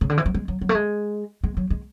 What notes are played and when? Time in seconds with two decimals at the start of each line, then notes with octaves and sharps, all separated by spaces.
0.01 C#3
0.09 D3
0.18 E3
0.26 F#3
0.34 G#3
0.48 F#3
0.61 F#3
0.69 A3
0.75 G#3
1.44 G#3
1.57 F#3
1.70 G#3